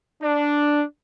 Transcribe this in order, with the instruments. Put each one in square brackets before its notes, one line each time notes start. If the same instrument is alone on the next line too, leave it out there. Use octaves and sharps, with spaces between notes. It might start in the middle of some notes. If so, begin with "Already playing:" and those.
[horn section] D4